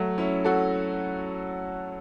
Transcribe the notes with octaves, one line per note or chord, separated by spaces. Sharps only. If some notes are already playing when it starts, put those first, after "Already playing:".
Already playing: F#3 A3
C#4 E4
F#4 A4